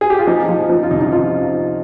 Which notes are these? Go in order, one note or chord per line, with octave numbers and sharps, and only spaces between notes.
G#4
G4
F4
F3 D#4
F3
F3
F4
C2 D#4
D#4
F3 F4